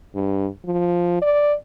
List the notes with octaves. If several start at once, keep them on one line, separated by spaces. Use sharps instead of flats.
G2
F3
D5